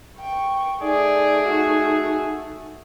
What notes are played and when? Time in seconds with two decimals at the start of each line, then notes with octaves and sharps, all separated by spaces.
0.18 G5 C#6
0.81 A3 D#4 G#4 D5
1.45 F#4